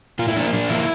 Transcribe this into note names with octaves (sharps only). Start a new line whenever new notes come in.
A#2 F4
E4
F3 A#3 D4
A#2 D4
F3 A#3 E4